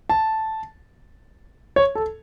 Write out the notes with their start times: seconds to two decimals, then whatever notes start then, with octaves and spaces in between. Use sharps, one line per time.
0.10 A5
1.76 C#5
1.95 A4